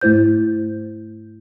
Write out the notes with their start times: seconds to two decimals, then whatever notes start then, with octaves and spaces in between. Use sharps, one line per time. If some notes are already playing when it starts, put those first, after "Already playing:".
0.01 G#2 A3 E4 C5 G6